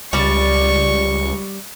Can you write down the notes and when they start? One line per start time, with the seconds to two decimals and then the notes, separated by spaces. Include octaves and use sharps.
0.13 C#2 G3 D5 C#6